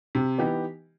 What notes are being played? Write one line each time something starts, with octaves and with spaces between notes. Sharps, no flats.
C3
E3 B3 D#4 G4